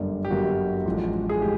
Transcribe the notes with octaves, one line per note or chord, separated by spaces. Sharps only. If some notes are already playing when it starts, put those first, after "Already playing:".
Already playing: G1 F#2 D3 G3 A#3
G4
G1 F#2 D3 G3 A#3 F#4
A1 A2 F3 G#3
G#4
A2 F3 G#3 G4